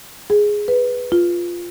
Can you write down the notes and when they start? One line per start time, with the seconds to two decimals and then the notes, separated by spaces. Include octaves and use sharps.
0.30 G#4
0.68 B4
1.12 F4